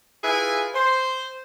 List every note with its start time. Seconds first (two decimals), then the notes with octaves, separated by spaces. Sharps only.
0.23 E4 F4 G#4 B4 G#5
0.75 C5